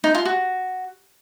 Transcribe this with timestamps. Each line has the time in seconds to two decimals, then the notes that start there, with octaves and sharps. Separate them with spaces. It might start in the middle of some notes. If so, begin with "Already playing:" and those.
0.04 D#4
0.15 F4
0.25 F#4